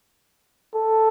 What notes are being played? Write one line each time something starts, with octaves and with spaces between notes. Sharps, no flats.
A4